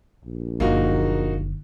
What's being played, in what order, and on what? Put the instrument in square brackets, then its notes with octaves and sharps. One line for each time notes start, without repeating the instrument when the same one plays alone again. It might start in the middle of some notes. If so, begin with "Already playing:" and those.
[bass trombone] A#1
[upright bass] F#1 D3 [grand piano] A#3 D#4 F#4